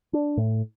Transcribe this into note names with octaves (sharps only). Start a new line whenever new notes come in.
D4
A2